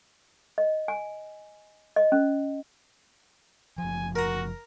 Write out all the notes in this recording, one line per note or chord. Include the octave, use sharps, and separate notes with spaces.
D#5
G#5
D#5
C#4
F#1 F3 G#5
F#4 A#4 A#5